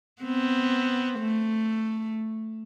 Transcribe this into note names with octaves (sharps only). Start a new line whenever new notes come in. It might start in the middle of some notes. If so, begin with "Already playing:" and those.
B3 C4
A3